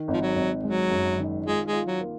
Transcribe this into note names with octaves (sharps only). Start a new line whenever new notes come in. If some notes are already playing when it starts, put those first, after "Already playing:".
Already playing: D#3
G#1 F3
F#3
G#1
F#3 G#3
F#2
D#3
G#3 F4
G#3
F4
F#3
A#3